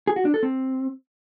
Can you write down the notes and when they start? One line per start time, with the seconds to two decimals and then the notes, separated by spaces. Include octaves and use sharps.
0.07 G#4
0.16 F#4
0.25 D4
0.34 A4
0.43 C4